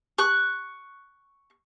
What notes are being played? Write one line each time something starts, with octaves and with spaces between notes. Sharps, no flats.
C#6 F#6